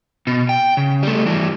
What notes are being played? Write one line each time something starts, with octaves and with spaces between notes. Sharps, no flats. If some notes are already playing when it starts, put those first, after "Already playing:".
B2
G5
C#3
G3 A3
E3 G3